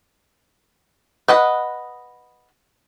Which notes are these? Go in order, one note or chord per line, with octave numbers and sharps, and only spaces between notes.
B4 D#5 F#5